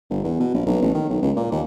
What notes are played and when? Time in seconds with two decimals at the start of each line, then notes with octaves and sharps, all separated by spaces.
0.11 G1
0.24 E2
0.40 B2
0.54 A#1
0.66 B1
0.82 A1
0.95 D#3
1.10 B1
1.23 C#2
1.37 A#2
1.52 D#2